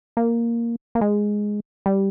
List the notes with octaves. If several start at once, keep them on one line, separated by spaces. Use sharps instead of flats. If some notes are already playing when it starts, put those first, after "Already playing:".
A#3
A#3
G#3
G3